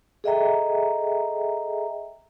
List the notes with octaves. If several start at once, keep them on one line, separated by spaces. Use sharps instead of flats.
G#4 A4 D#5 E5 G5 A#5